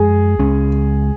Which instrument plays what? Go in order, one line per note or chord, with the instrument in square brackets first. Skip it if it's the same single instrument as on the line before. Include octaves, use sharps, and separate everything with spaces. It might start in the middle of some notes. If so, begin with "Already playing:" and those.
Already playing: [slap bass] F#2 F3 G#3 [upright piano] G#4
[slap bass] C#2 C#3 G#3 C#4